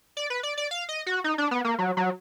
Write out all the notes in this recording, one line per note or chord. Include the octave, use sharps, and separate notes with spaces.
D5
B4
D5
D5
F5
D#5
F#4
D#4
D4
B3
A#3
F#3
F#3